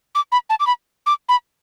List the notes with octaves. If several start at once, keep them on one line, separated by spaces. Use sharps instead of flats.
D6
B5
A5
D6
B5
D6
B5